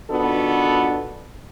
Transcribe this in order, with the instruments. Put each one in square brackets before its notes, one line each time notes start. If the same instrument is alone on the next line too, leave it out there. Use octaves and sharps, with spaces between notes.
[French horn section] D#3 B3 D4 F4 F#4 A4